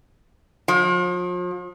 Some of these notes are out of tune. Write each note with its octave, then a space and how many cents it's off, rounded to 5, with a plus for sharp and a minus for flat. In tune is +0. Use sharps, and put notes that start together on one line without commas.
F3 +40